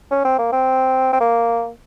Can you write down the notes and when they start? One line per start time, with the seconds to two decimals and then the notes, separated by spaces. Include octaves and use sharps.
0.11 C#4
0.25 C4
0.39 A#3
0.52 C4
1.13 C4
1.20 A#3